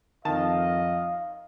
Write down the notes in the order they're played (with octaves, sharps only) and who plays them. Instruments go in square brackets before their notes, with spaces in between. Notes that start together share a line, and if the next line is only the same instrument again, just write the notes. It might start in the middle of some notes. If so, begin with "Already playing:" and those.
[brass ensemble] F2 D#5 [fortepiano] D#3 A5 [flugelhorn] F5